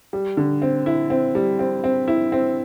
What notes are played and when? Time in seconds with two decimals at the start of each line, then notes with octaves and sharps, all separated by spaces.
0.13 G3
0.37 D3
0.62 C4
0.86 E4
1.10 C4
1.35 G3
1.59 C4
1.84 C4
2.08 E4
2.32 C4